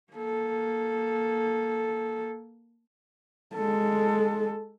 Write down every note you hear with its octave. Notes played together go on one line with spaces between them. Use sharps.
A#3 A4
G#3 A4